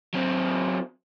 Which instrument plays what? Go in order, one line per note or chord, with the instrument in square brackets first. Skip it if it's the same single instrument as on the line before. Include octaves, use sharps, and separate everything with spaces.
[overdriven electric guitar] F#3 C4